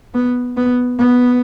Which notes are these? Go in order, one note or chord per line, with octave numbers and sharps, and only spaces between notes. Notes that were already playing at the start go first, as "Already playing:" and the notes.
B3
B3
B3